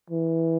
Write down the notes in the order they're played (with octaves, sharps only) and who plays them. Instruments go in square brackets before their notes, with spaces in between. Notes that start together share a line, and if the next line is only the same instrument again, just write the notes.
[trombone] E3